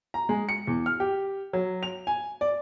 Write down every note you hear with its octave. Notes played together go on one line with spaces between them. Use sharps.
A#5
G#3
C#7
E2
F6
G4
F#3
F7
G#5
D5